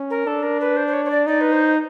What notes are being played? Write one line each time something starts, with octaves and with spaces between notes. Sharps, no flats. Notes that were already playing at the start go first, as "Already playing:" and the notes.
Already playing: C#4
A#4
D4 A4
A#4
B4
C5
C5
C#5
C#5
D5
D#4 D5
B4
C5